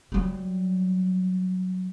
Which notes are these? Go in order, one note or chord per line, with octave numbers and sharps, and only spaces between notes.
F#3 G3